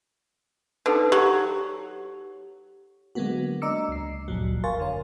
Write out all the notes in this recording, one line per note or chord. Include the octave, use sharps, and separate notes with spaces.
D3 D#4 A4 B4
F#3 G4
D3 F#3 G#3 A#3 B3 F#4
D4 D#5 A#5 D6 E6 C#7
C#2 C7
G1 D2 A#2 F3 F#3
A#4 F5 G#5 C6 C#6 A6
F2 D3 C#5